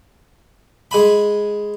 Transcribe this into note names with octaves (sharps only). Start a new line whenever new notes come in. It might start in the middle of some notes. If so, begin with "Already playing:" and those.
G#3 G#5 B5